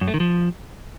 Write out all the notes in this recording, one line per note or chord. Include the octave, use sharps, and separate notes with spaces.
F#2
A3
D#3
F3